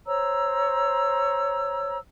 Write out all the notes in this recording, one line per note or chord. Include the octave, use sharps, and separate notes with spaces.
C5 C#5 A#5 E6